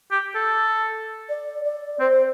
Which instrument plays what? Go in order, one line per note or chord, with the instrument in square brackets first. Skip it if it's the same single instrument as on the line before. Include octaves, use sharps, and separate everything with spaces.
[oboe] G4
A4
[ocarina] D5
D5
[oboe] C4 [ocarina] C5